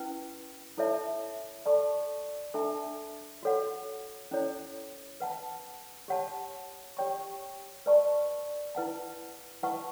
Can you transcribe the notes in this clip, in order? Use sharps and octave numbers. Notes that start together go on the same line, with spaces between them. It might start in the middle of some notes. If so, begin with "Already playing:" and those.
Already playing: C#4 E4 B4
E4 A4 C#5 E5 A5
A4 D5 A5 C#6
D4 A4 E5 A5
F#4 A4 C#5 F#5
C#4 E4 A4 C#5
B4 F#5 A5
G4 C#5 F#5 A5
G4 C#5 G5 C#6
B4 D5 A5 C#6
E4 B4 F#5 A5
E4 B4 F#5 A5 C#6